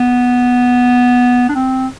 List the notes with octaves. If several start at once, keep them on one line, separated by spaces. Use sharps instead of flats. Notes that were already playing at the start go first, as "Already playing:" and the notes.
Already playing: B3
D4
C4